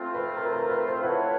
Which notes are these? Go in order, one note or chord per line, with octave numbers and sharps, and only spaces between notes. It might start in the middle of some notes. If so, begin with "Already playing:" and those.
Already playing: A3 C4 F4
B4
A#4
B4
A#4
B4
C5
E4 A4 B4 C#5 F#5